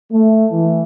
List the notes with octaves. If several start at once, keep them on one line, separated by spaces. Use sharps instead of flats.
A3
E3